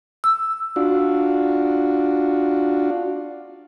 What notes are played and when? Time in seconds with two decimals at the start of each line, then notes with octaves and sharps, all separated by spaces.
0.24 E6
0.76 D4 F4 F#4